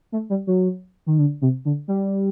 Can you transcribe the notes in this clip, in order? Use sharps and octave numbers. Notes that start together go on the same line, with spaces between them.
A3
G3
F#3
D#3
D3
C3
D3
G3